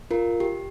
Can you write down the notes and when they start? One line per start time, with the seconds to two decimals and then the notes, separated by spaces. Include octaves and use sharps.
0.11 F4 A#4
0.40 G4